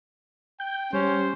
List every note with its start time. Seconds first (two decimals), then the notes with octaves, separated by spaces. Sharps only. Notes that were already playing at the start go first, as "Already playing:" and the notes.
0.60 G5 G6
0.93 G3 C#4 C5